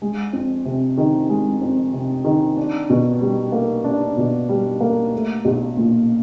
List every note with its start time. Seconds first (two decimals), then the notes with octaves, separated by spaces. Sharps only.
0.02 G#3
0.33 F2
0.65 C3
0.98 D#3
1.29 G#3
1.61 F2
1.93 C3
2.25 D#3
2.57 D4
2.90 B2
3.21 G3
3.52 A#3
3.84 D4
4.17 B2
4.49 G3
4.80 A#3
5.13 A3
5.45 B1
5.77 A#2